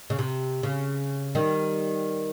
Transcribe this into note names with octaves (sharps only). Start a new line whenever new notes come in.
C#3
C3
C#3
D#3 G3